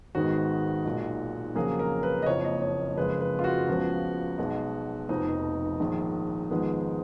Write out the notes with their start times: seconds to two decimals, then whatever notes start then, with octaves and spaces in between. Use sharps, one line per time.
0.15 G#1 G#2 D#3 G#3 B3 F#4
0.85 B1 A#2 G#3
1.55 F2 C#3 F#3 A#3 G#4
1.79 A#4
2.03 B4
2.22 D#5
2.26 F#1 F2 F3 A#3 C#5
2.44 D#5
2.62 C#5
2.97 F#1 F2 C#3 G#3 B4
3.21 B4
3.39 F4
3.44 F#4
3.68 C#2 C#3 F3 B3
4.38 B1 B2 G#3
5.09 F1 F2 F3 B3 D#4
5.80 A#1 G#2 D#3 G#3
6.50 G#1 G#2 F3 G#3 B3